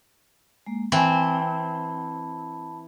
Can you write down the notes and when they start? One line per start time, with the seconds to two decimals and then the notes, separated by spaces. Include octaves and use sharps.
0.66 G#3 A#3
0.92 E3 C4 A5 B5